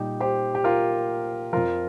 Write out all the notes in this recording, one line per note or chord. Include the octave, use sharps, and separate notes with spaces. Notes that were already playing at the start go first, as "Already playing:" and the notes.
Already playing: A#2 G3 D#4 G4
G4 C5
G4
F4 A#4
F2 F3 F4 A#4